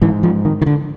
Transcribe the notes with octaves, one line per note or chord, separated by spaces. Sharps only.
G#2 E3
F3
D#3
D#3
D3